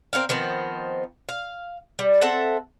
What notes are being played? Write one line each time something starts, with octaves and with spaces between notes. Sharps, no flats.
C4 E4 A#4 F5
D#3 F3 B3 C4
F5
G3
C4 A4 E5 F#5